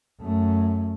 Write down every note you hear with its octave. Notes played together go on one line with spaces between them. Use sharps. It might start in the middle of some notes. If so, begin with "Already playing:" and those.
F#2 A3